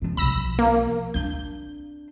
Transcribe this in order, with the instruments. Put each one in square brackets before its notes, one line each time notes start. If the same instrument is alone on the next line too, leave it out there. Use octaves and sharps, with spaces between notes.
[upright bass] F3 C#4
[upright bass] B1 F3 [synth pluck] B5 E6 A#6
[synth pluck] A#3
[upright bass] C4 D4 [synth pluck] G6